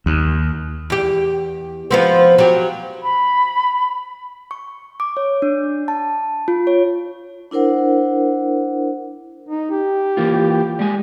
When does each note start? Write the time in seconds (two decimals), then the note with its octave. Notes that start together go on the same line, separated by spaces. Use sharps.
0.06 D#2
0.90 E2 G4
1.91 F3 B3 C4
2.38 F#3 G4
3.02 B5
4.51 C#6
5.00 D6
5.17 C#5
5.42 D4
5.88 A5
6.48 F4
6.67 C#5
7.51 D4 E4 A#4 C5 F#5
9.49 D#4
9.71 G4
10.17 E3 A#3 F4
10.79 G3 G#3 G#5